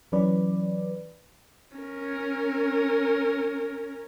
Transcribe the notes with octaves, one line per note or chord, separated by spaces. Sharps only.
E3 F#3 C#4 B4 D5
C#4 A#4